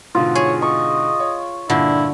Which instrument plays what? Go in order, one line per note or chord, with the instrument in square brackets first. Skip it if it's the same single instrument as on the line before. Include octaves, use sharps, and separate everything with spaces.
[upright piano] G#2 B2 D3 [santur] F4
[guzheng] G#4 [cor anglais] C#5
[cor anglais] D#5 [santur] C#6
[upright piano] C#5
[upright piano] G2 A#2 [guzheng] D3 [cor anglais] E4